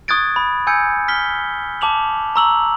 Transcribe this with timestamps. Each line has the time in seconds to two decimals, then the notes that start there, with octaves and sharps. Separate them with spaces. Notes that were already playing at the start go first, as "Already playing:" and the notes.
0.08 C#6 D#6 F#6 G#6 A6 D7
0.36 B5
0.67 G#5 E6 G6 G#6 C#7
1.08 F6 B6 G7
1.81 A5 D6 F7 F#7
2.36 A#5 C#6 E6 F7 F#7